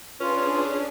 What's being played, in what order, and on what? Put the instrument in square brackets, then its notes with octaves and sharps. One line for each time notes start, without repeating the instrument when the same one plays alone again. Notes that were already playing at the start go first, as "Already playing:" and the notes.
[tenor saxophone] C#4 [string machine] D4 G#4 [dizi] F4 [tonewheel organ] B4